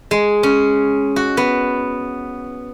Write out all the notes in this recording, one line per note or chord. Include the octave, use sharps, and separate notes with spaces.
G#3
C#4
F#4
B3